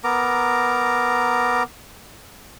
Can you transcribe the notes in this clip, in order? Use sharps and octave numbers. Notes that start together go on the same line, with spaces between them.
B3 A#4 A#5 D6